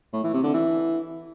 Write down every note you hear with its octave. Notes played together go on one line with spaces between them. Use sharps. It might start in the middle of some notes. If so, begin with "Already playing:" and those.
A2
E3
C3
D3
E3